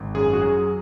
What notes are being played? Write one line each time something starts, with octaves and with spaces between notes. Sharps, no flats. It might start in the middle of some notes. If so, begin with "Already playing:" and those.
Already playing: G#1
F#2 G#4
F#4
F#3 G#4